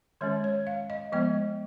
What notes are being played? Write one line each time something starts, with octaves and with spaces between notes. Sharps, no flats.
D#3 G#3 C#4 C#5
C#5
F5
D#5
F3 G#3 B3 D#5